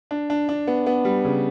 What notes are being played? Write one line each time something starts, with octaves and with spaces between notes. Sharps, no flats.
D4
D4
D4
B3
B3
G3
C#3